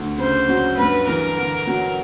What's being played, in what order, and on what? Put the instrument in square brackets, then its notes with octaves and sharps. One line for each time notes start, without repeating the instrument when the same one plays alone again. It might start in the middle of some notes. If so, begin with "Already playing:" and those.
Already playing: [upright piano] D2
[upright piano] C#3 [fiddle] C5
[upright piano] F#3
[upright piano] G2 [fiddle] B4
[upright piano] E3 [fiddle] A#4
[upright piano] D3
F#3